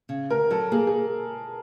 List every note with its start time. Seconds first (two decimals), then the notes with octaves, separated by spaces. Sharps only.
0.09 C#3
0.30 D2 A#4
0.51 F#3 A4
0.72 A#3 G#4
0.87 G#4